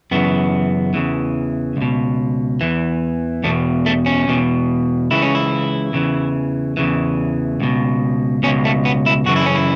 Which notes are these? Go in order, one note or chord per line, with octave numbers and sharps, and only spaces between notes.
F#2 C#3 E3 B3
E2 C#3 E3
C#2 B2
E2 E3
E2 B2 A3
A3
C#4
E2 B2
C#2 C#3 E3 E4
C#4
E4
E2 C#3 E3
E2 C#3 E3
C#2 B2
C#2 B2 C#4
A3
B3
E4
F#2 C#3 E3 F#4
E4
C#4
E4